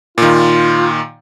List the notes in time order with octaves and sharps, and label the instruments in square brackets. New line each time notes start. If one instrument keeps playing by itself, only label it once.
[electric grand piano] A#2 D#3 [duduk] F4